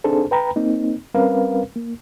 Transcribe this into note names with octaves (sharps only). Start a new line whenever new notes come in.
C4 D4 D#4 G#4 A4 C5
B4 G5 A#5 B5
A#3 C4 D#4
G3 C4 C#4 A#4 B4 F5
A#3